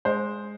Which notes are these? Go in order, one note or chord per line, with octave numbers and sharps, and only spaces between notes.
G#3 C5